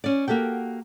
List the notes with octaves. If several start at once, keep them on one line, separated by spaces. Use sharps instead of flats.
C#4 D5
A#3 F#4 G4 A4 G5